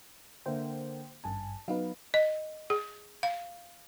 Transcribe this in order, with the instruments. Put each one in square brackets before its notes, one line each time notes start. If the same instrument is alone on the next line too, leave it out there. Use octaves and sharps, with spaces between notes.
[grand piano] D3 A#3 E5 [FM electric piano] C5 G5
[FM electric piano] G#1 G2 G#5 [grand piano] A5
[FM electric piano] F#3 D#4 B4 [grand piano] B3 F5
[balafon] D#5
G#4
F5